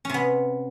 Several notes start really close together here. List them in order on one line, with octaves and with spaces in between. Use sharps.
C#4 C3 B3